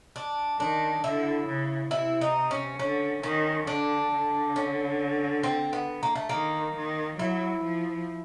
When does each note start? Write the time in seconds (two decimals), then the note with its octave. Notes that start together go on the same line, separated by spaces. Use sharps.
0.16 D4
0.59 D#3 D4
1.03 D3 E4
1.47 C#3
1.91 C3 E4
2.21 D#4
2.51 C#4
2.79 D3 C#4
3.23 D#3 C#4
3.67 D3 D4
4.12 D3
4.56 C#4
5.43 C4
5.73 B3
6.03 A#3
6.15 A3
6.29 D#3 A#3
6.76 D#3
7.19 F#3 E4
7.63 F3